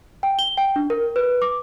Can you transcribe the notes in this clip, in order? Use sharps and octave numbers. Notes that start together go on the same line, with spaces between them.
G5
G7
G5
D4
A#4
B4
D6